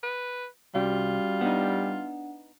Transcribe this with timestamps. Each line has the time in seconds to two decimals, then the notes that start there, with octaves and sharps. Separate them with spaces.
0.03 B4
0.75 C2 G3 C#4 F4 F#4 F5
1.41 B3 D4 D#4 F#5